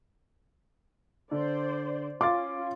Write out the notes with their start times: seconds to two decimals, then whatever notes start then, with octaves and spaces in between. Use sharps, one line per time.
1.31 D3 C5 D5
2.21 C#4 F4 F5 C6 D6 A6